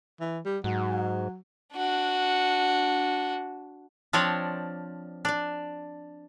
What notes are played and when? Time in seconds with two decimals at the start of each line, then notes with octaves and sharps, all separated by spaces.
0.21 E3
0.45 G3
0.64 G#2 F#3
1.75 D4 F#4
4.13 F3 C4 D4 C#5 D5
5.25 D4 D5